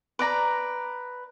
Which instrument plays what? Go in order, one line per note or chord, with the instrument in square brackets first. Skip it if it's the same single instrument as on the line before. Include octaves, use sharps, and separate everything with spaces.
[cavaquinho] B4 D5 A#5